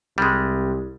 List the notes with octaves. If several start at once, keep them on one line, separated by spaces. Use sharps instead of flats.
C2 G3 G#3